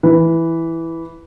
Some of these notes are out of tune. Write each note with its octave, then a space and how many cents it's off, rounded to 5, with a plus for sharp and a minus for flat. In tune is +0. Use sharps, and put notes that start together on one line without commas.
E3 +0 B4 +0